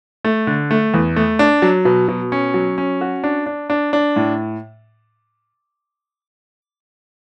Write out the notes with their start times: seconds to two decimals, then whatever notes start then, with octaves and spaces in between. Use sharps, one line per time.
0.25 A3
0.47 D3
0.71 A3
0.94 E2
1.16 A3
1.39 D4
1.62 F#3
1.85 B2
2.08 B2
2.32 C#4
2.54 F#3
2.78 C#4
3.01 F#4
3.24 D4
3.46 D4
3.70 D4
3.93 D4
4.16 A2